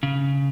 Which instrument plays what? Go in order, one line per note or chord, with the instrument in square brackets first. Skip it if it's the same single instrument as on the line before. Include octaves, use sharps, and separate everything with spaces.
[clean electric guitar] C#3